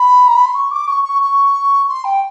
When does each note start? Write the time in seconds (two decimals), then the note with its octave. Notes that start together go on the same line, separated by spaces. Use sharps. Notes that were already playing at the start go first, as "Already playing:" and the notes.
Already playing: B5
0.27 A#5
0.36 B5
0.45 C6
0.55 C#6
0.71 D6
0.87 C#6
1.04 C#6
1.22 C#6
1.89 C6
2.04 G5